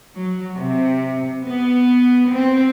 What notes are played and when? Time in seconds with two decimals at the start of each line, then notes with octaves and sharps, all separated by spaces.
0.15 F#3
0.58 C3
1.47 B3
2.31 C4